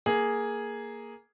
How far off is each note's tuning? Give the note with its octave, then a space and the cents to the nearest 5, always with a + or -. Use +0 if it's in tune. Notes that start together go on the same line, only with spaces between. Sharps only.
A#3 +0 G#4 +0